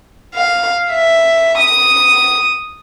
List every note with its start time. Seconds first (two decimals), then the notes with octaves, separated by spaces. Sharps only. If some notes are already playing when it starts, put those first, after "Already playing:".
0.35 F5
0.92 E5
1.59 D#6